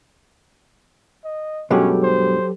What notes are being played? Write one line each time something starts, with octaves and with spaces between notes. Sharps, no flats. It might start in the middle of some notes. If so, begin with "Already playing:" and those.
D#5
G2 B2 F#3 G#3 C#4 G4 A4
C5